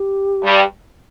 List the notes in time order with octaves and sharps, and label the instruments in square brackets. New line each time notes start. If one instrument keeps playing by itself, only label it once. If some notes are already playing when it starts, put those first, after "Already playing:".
Already playing: [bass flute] G4
[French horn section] G2 G3